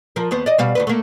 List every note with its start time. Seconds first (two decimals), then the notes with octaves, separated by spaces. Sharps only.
0.16 F3 A#4
0.31 D#2 B3 C5
0.46 D5 D#5
0.58 B2 G3 F5
0.75 D2 A#2 B4
0.87 A3 A#3